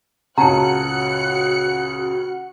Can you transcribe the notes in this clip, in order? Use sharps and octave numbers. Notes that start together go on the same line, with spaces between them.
C#2 A#2 C#3 F#4 A5 A#5 F#6 C#7